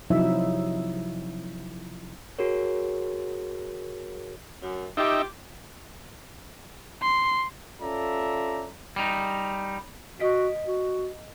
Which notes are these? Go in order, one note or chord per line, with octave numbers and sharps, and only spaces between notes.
C3 F3 F#3 D#4 E4 E5
F#4 G#4 A#4 C#5
F#2
D#4 F4 G4 E5
C6
C#4 F4 A4 D5 E5 A#5
G3 D#4
F#4 D#5 B6 D7
F#4